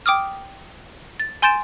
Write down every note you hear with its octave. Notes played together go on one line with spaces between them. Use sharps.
G5 D6 D#6 F6
A6
G#5 C6 G6 A6 D7 E7